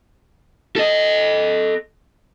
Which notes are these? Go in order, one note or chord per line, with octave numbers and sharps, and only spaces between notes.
A4 D#5